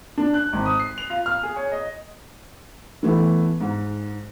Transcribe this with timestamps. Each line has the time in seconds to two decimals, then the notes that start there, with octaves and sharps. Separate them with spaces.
0.18 D4
0.34 F#6
0.53 G#1
0.65 D#6
0.80 C7
0.98 F7
1.10 F4
1.26 F6
1.43 G#4
1.56 C#5
1.72 D#5
3.03 E3 A3 B3
3.61 G#2